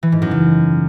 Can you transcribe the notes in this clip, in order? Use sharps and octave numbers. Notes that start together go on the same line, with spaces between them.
E3
G#2
F#2
C#3